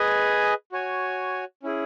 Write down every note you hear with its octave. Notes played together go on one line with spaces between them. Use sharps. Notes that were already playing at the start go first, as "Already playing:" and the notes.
Already playing: G#4 B4 D#5 G#5
F#4 C#5 G#5
C#4 E4 G#4